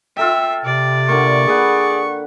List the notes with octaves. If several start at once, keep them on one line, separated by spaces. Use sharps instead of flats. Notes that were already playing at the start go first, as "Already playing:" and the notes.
F4 A4 E5 G5
C3 D5
A#2 D3 C#6
G#4 F#5 B5